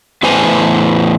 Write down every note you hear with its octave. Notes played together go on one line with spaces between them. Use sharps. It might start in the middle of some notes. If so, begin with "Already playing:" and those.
E2 A2 B4 C5 G#5